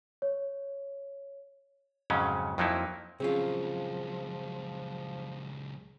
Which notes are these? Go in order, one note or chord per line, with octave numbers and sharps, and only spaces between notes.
C#5
F2 G#2 C#3 F#3 C#4
F2 F3 F#3 A#3 D#4 E4
C#2 F3 F#3 C4 C#4 F4 G#4